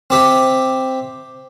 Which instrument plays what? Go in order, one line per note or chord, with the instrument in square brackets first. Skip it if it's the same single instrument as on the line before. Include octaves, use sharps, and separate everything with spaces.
[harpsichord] C4 G4 E5